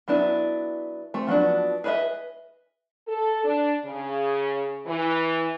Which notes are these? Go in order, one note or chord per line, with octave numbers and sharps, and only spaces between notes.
F#3 B3 D4 E4
A3 C4
F3 F#3 B3 D4
G#4 B4 C5 D#5 E5
A4
D4
C#3
E3